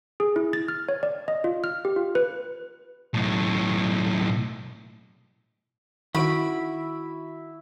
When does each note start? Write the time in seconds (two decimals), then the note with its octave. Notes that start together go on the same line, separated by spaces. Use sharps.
0.20 G#4
0.36 E4
0.53 A6
0.68 F6
0.89 C#5
1.03 D5
1.28 D#5
1.44 F4
1.64 F6
1.85 G4
1.96 F4
2.15 B4
3.14 B1 A2
6.15 D#3 E4 F#4 E5 B5 D7